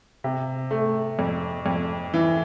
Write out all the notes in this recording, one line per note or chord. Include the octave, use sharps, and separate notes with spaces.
C3
A3
F2
F2
E3